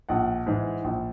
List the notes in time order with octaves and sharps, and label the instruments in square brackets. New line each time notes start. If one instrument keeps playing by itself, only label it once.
[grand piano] A#1 F#5
G#2 E3 G#3
A#1